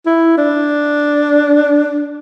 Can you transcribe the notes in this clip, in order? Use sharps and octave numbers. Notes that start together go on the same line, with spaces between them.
E4
D4